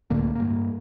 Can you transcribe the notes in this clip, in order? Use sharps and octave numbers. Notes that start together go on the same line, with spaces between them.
C#2 A2 D3 A#3
G2 A#3